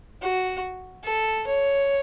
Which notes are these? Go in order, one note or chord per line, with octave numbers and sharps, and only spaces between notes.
F#4
A4
C#5